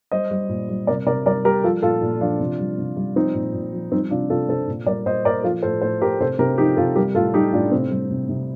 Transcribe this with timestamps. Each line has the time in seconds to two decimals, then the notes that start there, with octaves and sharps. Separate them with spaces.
0.12 G3 C5 D#5
0.31 G3
0.49 A#2
0.69 G3
0.87 C3 A#4 D5
1.06 C3 A#4 D5
1.26 G3 A#4 D5
1.45 G3 G4 A#4
1.64 F3 F4 A4
1.82 A#2 F4 A4
2.02 A#2
2.21 F3 D4 F4
2.40 C3
2.60 G3
2.78 C3
2.97 G3
3.15 F3 C4 D#4
3.34 A#2
3.54 A#2
3.73 F3
3.92 G3 C4 D#4
4.11 C3 D4 F4
4.30 C3 F4 A4
4.49 C3 A4 C5
4.68 A#2
4.86 G3 A#4 D5
5.05 A#2 C5 D#5
5.25 A#2 A#4 D5
5.44 F3 F4 A4
5.63 A2 A4 C5
5.82 A2 A4 C5
6.02 A2 G4 A#4
6.20 C3 A4 C5
6.39 C3 G4 A#4
6.58 F3 D#4 G4
6.77 C3 F4 A4
6.96 G3 G4 A#4
7.15 A2 F4 A4
7.34 G3 D#4 G4
7.53 A2 D4 F4
7.72 C3 C4
7.91 G3
8.11 C3
8.29 C3